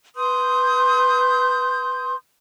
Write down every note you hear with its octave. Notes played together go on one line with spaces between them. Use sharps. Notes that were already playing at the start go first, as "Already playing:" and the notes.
B4 C6 D#6 G6